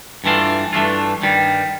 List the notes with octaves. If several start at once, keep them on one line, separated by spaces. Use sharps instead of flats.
G2 E3 A3 D4 F4
G2 E3 A3 D4 F4
G2 D#3 G3